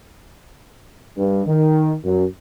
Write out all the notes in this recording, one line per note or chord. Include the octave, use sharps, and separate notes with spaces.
G2
D#3
F#2